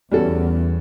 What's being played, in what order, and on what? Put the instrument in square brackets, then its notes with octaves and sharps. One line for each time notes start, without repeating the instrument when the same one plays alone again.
[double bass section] E2 [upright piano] G3 C#4 F#4 A4